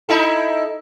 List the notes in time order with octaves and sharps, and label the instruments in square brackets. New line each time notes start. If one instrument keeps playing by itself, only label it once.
[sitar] D#4 E4 A4